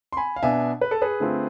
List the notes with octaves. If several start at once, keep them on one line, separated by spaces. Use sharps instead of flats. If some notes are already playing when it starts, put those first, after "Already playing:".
C6
G#5 B5
F5
B2 B3 D4 E5 G#5
B4
A4
G#4 B4
D3 A3 C4 F4